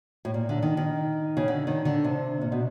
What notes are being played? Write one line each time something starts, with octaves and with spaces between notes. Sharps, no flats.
A2
A#2
D3
D#3
D#3
C#3
D3
D#3
D3
C3
A#2
B2